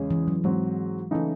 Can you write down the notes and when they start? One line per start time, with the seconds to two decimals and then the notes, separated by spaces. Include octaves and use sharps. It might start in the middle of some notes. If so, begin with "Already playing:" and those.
Already playing: E2 C#3 G#3 C#4 G#4
0.11 E3
0.28 F#3
0.44 G#2 F#3 G#3 C4
1.11 C#3 E3 A3 D#4 E4